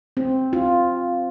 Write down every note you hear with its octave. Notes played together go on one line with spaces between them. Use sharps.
C4
F4